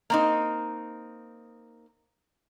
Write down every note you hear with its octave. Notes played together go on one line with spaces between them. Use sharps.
A#3 C4 D#4